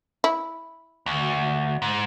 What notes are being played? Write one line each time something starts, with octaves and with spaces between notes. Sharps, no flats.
E4
D2
G#2